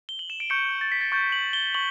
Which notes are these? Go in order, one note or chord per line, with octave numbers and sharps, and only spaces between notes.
G7
F#7
E7
D7
C#6 G6 C#7
A6
B6
A6
C#6 G6 A6
F#7
G7
C#6 F#7